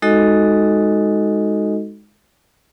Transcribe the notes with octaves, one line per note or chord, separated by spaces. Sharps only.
G#3 D#4 F#4 A4 D#5